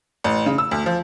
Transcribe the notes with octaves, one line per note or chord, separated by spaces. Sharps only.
A1
C#3
E6
D2
F3